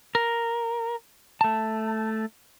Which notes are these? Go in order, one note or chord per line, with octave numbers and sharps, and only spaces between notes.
A#4
A3 A5